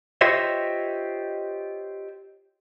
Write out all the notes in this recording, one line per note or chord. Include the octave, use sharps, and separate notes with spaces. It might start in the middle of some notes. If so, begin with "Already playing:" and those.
F4 G4 C5 C#5 D#5 E5